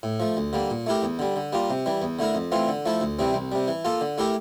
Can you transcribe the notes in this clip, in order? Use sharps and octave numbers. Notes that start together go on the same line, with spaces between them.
A2
F3 A3
D2
D3 G3 A#3
A#2
A3 E4 G4 A#4
E2
D3 G3
D3
G3 A#3 F4
C3
E3 G3
E2
D3 A3 E4 A#4
F2
E3 A3 C4 F4
D3
F3 A3 E4 A4
D2
C3 E3 G3 C4
C2
C3 G3
E3
A#3 F4 A4
D3
A3 E4 G4 A#4